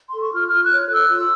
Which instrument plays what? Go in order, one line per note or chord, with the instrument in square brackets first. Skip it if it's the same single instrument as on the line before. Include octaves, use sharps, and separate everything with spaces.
[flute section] A4 C6
C#6
F4 F6
F4 F6
F#6
C#5
A4 E6
F4